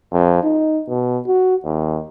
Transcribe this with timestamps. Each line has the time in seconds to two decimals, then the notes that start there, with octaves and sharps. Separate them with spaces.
0.12 F2
0.43 D#4
0.88 B2
1.27 F#4
1.65 D#2